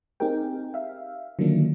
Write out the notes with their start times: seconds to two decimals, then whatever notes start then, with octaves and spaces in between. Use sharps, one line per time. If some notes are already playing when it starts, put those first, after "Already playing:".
0.20 C4 D#4 G4 G#4 A#4 G5
0.74 E5 F5
1.39 D3 D#3 F3 F#3 A#3 D4